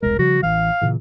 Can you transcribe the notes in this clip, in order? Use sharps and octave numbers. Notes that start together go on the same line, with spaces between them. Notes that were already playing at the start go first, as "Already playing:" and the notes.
E1 C2 G#3 A#4
C#3 F3 G3 F#4
A1 E3 F5
A#2 C#3 E3